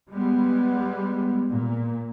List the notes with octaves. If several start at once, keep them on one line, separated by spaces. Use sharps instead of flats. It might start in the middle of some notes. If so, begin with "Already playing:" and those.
G3 G#3 B3
A#2